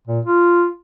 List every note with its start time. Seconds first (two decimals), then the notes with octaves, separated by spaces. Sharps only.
0.08 A#2
0.26 F4